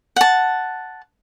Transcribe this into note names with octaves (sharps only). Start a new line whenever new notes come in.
F#5 A5